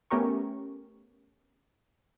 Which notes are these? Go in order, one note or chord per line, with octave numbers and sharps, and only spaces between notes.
A3 B3 C#4 G4 A#4 C#6